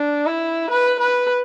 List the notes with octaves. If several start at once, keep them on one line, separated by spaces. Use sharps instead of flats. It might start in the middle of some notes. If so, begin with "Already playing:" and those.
Already playing: D4
E4
B4
B4